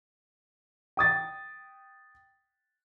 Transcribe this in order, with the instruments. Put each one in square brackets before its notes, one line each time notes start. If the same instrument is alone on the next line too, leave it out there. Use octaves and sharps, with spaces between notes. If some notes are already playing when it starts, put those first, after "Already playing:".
[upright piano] G5 D#6 A6